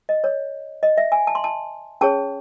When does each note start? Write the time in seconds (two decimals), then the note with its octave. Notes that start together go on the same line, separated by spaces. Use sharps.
0.09 D#5
0.24 C#5
0.83 D#5
0.98 E5
1.12 G#5
1.27 A5
1.35 C6
1.44 A5
2.01 C#4 G#4 C#5 A5